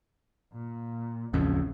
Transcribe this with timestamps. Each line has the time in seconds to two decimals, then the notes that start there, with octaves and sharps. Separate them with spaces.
0.53 A#2
1.33 D#1 A1 F2 C#3